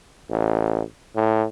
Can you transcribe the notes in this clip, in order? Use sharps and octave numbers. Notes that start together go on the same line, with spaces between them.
A1
A2